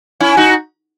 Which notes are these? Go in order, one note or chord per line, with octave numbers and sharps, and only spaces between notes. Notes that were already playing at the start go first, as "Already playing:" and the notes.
C#4 E4
D#4 F#4